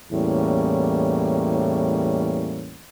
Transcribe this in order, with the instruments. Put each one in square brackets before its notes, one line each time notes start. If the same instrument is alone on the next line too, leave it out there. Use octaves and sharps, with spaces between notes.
[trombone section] E2 A2 E3 G3 A#3 C#4